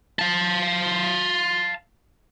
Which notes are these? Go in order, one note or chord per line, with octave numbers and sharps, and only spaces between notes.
F5 A5